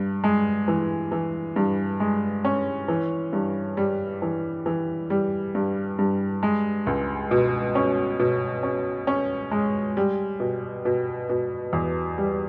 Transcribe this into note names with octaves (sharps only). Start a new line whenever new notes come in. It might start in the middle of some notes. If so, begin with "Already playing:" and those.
Already playing: G2
G#3
E3
E3
G2
G#3
C#4
E3
G2
G3
E3
E3
G3
G2
G2
G#3
C#2
B2
C#4
B2
C#4
C#4
G#3
G3
B2
B2
B2
E2
G3